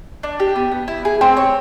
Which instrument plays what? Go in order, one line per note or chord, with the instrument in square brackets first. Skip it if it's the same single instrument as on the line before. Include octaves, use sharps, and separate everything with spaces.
[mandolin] D4
G4
B3
B3
E4
G#4
[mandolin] C4 [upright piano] G5
[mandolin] C#5